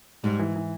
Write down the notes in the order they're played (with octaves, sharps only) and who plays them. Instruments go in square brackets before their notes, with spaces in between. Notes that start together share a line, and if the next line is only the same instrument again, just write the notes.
[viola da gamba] G#2 [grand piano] G3
[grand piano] E3
E3